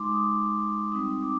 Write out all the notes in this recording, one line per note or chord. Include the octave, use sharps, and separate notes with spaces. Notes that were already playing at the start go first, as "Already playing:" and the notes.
Already playing: G#3 D#4 C6 D6
D#6
G3 C4 D#4 D#6
D6